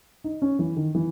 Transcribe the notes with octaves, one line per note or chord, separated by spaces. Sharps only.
D#4
C#4
E3
D#3
E3